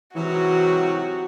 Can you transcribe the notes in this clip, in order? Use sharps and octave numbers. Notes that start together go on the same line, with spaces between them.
G#2 C3 E3 F#3 F#4